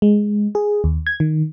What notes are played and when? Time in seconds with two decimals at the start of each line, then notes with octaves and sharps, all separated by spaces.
0.02 G#3
0.55 G#4
0.84 D#2
1.07 G#6
1.20 D#3